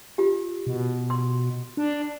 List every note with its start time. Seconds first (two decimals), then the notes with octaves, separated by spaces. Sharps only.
0.18 F4 G4
0.67 B2
1.10 C6
1.77 D4